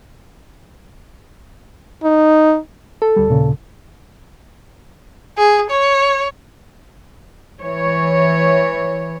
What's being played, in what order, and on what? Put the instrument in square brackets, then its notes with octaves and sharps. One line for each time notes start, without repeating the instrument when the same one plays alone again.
[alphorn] D#4
[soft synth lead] A4
[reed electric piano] D2 G3
D#2 A#2 C#3
[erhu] G#4
C#5
[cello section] E3 C#5